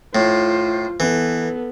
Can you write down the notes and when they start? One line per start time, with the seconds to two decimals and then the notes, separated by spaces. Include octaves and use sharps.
0.15 A2 F4 C5
1.00 E3 B3 A4